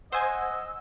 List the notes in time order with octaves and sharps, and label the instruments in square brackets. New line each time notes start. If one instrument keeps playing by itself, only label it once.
[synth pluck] C5 G#5 [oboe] D#5 [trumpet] F#5 [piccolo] E6